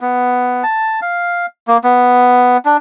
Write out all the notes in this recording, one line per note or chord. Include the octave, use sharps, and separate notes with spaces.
B3
A5
F5
A#3
B3
D4